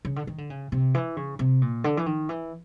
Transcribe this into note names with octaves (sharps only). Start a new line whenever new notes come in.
C#3
D3
D#3
D3
C#3
C3
E3
C#3
C3
A#2
D3
E3
D#3
E3